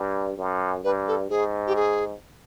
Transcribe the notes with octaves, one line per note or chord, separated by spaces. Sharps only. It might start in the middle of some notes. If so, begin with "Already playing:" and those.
Already playing: G2
F#2
G2 B4
A4
G#2 G#4
G4
G#4